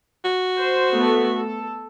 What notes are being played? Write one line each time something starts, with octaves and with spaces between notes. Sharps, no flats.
F#4
C5
A3 B3 A4
A4